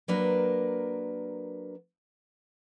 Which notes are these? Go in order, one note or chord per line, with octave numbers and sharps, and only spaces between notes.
F#3 A#3 D4 A#4 B4